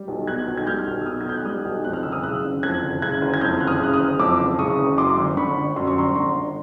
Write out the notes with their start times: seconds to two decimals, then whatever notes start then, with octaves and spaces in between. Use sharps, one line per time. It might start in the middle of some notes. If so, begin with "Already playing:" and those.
Already playing: G3
0.08 B1
0.27 B2 F#6 G#6
0.47 B1
0.57 G#6
0.67 G3 F6 G6
0.87 B1
1.01 E6
1.06 B2 D#6 F6
1.21 G#6
1.25 B1 G6
1.37 F#6
1.45 G3 D#6 F6
1.65 B1
1.84 F2 F#6
1.93 F6
2.03 F#1 E6
2.12 D#6 F6
2.23 C#3 E6 F#6
2.43 F#1
2.63 F2 F#6 G#6
2.83 F#1
3.02 C#3 F#6 G#6
3.21 F#1
3.34 G#6
3.41 F2 F6 G6
3.60 F#1 F#6
3.67 D#6 F6
3.81 C#3 F#6
3.93 D#6 F6
4.00 F#1
4.19 F2 D6 E6
4.39 F#1
4.59 C#3 C#6 D#6
4.78 F#1
4.98 F#2 C6 D6
5.18 G1
5.37 D3 B5 C#6
5.56 G1
5.76 F#2 C6
5.87 C#6
5.96 G1 A#5 C6
6.09 C#6
6.15 D3 A#5 C6
6.35 G1